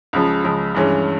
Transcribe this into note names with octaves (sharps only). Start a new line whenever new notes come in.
C#2 C#3 F3 G#3
C#2 C#3 F3 G#3
G2 E3 G#3 C#4